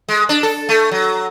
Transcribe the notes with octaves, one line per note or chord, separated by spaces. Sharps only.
G#3
D4
A4
A3
F#3